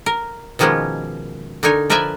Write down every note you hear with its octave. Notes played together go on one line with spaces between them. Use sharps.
A#4
B2 D#3 F3 G#3 A#3 C#4
D3 D#4 A#4 C#5 G#5
F3 A#4 B4 D5 E5 G#5